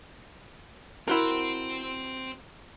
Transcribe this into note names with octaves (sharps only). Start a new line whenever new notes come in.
C4 E4 F#4 A#4 C6